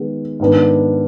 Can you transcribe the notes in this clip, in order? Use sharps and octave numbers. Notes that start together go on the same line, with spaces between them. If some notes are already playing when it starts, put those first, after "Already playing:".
Already playing: D#3 G#3 B3
G#2 D#3 B3 D4